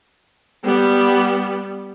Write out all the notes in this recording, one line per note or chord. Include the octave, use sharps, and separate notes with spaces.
G3 B3